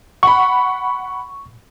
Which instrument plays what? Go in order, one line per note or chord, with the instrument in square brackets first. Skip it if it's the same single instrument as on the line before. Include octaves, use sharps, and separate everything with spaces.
[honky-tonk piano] F#5 B5 [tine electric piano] C#6